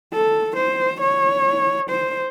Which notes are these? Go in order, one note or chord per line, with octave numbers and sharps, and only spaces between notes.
A4
C5
C#5
C5